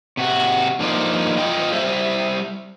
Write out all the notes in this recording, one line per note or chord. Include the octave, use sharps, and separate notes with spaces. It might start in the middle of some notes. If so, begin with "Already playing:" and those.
C3 F#4
G2 F3 A#3 D#4 C5 D5
F4 D#5 G5
G3 C5 E5